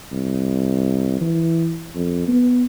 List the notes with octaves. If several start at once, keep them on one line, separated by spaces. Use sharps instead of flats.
C2
E3
F2
B3